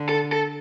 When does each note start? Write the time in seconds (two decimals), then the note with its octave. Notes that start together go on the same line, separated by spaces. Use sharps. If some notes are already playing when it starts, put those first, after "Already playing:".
Already playing: D3
0.09 A4
0.32 A4